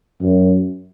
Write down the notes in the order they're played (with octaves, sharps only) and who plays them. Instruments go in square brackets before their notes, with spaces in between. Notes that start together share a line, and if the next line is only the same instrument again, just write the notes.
[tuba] F#2